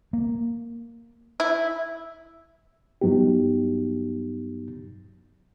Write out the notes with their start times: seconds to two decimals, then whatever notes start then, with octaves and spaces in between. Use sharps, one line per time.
0.13 A#3
1.40 E4
3.01 G2 F#3 B3 D#4 G4